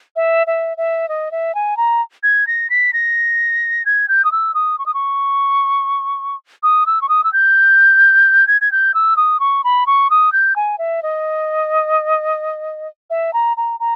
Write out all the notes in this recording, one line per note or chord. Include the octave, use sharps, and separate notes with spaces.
E5
E5
E5
D#5
E5
G#5
A#5
G#6
A#6
B6
A#6
G#6
G6
D#6
E6
D#6
C#6
D#6
C#6
D#6
E6
C#6
D#6
E6
G6
G#6
G#6
G6
E6
D#6
C#6
B5
C#6
D#6
G6
G#5
E5
D#5
E5
A#5
A#5
A#5